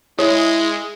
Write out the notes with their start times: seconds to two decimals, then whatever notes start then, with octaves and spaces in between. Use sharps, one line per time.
0.19 G#3 E4 G#4 C#5